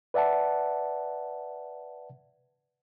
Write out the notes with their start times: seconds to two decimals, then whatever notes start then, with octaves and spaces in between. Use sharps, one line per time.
0.14 B4 D5 E5 F#5 A5